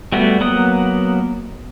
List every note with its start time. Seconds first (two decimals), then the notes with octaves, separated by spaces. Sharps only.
0.12 G3 A3 B3 F#4
0.40 F#3 A#3 B3 F#5 D#6